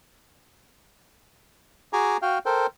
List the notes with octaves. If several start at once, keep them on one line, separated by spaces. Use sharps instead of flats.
F#4 G#4 G#5 A#5 D6
F#4 F5 G5
A4 A#4 C5 G5